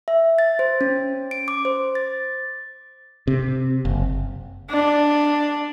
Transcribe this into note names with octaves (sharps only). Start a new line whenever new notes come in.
E5
A6
C5
C#4
D7
D6
C5
A6
C3
F#1
D4